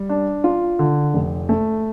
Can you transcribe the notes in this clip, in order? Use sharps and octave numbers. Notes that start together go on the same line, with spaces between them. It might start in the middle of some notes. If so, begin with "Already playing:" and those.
Already playing: G3
D4
F4
D3
F1
A3